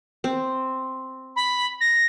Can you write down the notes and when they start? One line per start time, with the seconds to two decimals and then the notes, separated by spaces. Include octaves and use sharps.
0.24 C4
1.36 B5
1.81 A#6